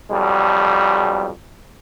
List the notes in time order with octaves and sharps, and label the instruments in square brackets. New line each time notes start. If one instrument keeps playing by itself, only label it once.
[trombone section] B1 F2 G3